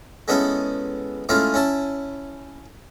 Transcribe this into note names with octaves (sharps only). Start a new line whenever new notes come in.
G#3 B3 C#4 E4 A4
G#3 A3 C#4 E4 F4
C#4 E4 A5